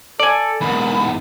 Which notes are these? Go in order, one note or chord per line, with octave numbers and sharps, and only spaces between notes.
A4 D5 G#5
E2 G#2 A#4 B5